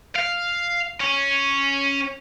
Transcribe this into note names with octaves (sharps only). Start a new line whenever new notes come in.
F5
C#4